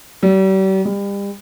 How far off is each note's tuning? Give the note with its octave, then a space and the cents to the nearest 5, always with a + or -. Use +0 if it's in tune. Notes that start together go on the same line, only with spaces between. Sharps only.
G3 -40
G3 +35